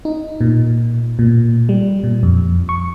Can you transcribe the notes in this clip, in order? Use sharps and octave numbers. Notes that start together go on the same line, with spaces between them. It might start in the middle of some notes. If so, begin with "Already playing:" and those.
D#4
A#2
A#2
G3
A#2
F2
C#6